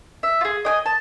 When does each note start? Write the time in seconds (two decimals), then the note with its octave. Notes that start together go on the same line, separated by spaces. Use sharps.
0.23 E5
0.41 F4 G#4
0.65 D#5 G5 G#5
0.86 A5